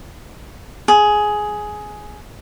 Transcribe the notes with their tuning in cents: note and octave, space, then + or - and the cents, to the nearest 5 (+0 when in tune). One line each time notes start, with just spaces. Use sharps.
G#4 +10